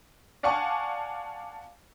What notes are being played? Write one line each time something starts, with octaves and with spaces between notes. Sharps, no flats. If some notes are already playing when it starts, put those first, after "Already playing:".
D5 F5 F#5 G#5 A5 C#6